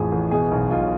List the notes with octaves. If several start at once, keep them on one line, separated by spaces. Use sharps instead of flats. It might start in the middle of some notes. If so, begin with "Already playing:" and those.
Already playing: A1 F2 A2 F3 G#4
A1
B2 G#4
B1
B1 F4